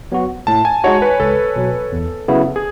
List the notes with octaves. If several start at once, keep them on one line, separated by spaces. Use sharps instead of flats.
F#3 B3 F#4
A2 A5
G#5
G#3 D#4 F#4 C#5
B4
C#2 A4
B2 F#3
E2
C#3 F#3 B3 E4
G#4